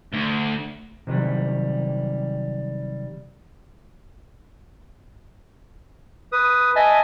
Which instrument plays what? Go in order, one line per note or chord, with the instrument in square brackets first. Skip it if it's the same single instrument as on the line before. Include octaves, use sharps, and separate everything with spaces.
[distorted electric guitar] D2
[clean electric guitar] C3 D#3 F#3 G3
[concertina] B4 D#6
D#5 E5 G#5 A5